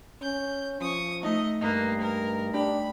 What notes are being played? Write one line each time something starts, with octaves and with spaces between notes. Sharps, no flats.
C#4 G6
F3 C#6 D#6
A3 D#4 D#5
G2 A#3 B4 D#5
A#4
D4 G4 B5